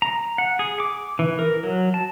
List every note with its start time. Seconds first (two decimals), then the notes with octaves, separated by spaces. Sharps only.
0.02 A#5
0.38 F#5
0.59 G#4
0.80 D6
1.19 E3
1.39 A#4
1.63 F#3
1.94 A5